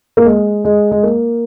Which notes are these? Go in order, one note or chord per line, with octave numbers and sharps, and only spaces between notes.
A#3
G#3
G#3
G#3
A#3